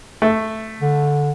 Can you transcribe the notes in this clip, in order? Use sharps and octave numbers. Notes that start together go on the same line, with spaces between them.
A3
D3